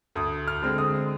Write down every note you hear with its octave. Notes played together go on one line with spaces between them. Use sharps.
D2 D#6
F6
D3 G#3 C4
D#6